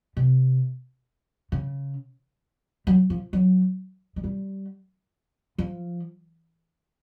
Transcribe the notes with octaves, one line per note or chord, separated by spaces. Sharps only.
C3
C#3
F#3
F3
F#3
G#3
G3
F3